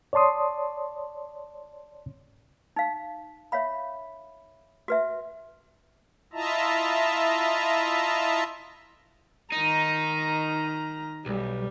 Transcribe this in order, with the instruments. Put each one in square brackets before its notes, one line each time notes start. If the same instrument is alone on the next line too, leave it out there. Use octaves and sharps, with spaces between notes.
[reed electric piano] C#5 D5 A5 C6 D#6
[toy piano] D#4 F5
C#5 E5 F5 B5
F#4 B4 E5
[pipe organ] E4 F4 D#5 E5 A5 A#5
[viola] D#3 A#5 [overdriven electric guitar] D#4
[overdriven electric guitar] B1 [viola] G3